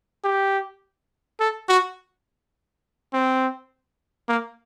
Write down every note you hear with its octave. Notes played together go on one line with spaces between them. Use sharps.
G4
A4
F#4
C4
A#3